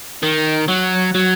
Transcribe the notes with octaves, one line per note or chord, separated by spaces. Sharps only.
D#3
F#3
F#3